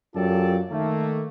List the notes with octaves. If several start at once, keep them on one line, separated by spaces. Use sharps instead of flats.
F#2 F4 G4 A4 D5 A5
D#3 A3 A#3